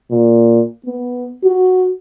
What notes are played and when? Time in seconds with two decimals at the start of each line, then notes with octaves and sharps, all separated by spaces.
0.11 A#2
0.86 B3
1.44 F#4